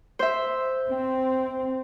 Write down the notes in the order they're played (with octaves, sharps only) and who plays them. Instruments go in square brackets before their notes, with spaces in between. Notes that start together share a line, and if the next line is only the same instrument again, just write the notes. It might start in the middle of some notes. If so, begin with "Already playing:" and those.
[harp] C5 E5
[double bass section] C4